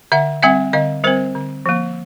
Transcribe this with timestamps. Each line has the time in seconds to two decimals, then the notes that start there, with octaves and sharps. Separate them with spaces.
0.12 D3 E5 F#5
0.43 G3 C4 E5 F#5
0.73 D3 D#5 F5
1.04 G3 C4 A#4 C5
1.35 D3
1.66 F3 A#3